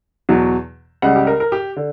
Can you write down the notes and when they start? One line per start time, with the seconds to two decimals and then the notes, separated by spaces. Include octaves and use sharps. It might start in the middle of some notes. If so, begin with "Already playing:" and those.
0.29 E2 B2 F#3
1.02 C#2 C#3 G3 F#5
1.16 G4
1.27 A#4
1.40 A#4
1.52 G4
1.76 D3